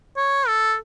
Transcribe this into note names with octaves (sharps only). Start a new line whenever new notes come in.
C#5
A4